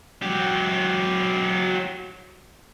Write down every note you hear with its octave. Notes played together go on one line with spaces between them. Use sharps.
F#3 G4